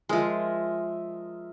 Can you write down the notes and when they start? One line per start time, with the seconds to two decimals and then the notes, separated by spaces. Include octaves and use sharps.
0.09 F3 G#3 A#4 D#5 E5